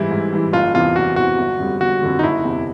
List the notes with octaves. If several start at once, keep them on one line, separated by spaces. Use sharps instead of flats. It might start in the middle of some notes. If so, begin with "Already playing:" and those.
Already playing: G#2 E3 G3 E4
G#2
E3 G3
F#1 F4
E2 C3 E3 F4
F#1 F#4
E2 C3 E3 F#4
G1
F2 D3 G3
G1 F#4
F2 D3 G3
D#4
F#1 E4
E2 C3